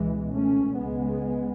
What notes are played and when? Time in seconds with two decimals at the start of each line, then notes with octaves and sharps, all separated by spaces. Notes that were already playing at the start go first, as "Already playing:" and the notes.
Already playing: C#2 B2 E3 G#3
0.33 A3 C#4
0.78 C#2 C#3 G#3 B3